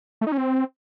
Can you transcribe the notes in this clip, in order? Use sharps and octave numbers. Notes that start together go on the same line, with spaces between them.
A3
D#4
C#4
C4